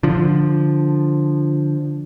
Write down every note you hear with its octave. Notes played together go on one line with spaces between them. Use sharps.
D3 F3